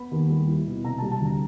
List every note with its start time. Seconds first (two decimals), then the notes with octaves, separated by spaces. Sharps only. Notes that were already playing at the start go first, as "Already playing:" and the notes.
Already playing: B3 B5
0.11 D#2
0.30 G3
0.48 E4
0.67 B2
0.85 C3 A#5
0.98 G3 A5
1.11 A5
1.21 D2 A#5